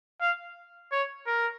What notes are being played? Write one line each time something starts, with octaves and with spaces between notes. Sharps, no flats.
F5
C#5
A#4